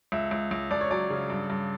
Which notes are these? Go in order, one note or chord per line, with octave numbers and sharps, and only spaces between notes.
C#2 E5
C#2
C#2
C#2 D5
C#5
F#3 D5
C#3
G2
G2